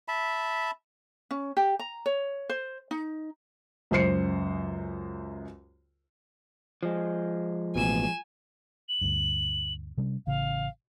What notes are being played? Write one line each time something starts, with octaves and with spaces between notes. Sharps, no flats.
E5 A5 B5
C#4
G4
A#5
C#5
C5
D#4
C#2 F#2 C5 C7 C#7
F3 G#3
A1 B2 G#5 E7
F#7
D2 G2
C3 G3 C#4
A1 C#3 F5